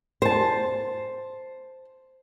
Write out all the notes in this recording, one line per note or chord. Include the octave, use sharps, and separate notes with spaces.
C5 A5